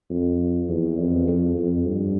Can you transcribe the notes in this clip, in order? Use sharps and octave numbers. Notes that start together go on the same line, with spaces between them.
F2
E2
F2
F2
F2
G2